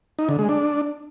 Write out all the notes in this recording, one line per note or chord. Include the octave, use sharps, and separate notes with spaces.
D#4
D3
G#3
D4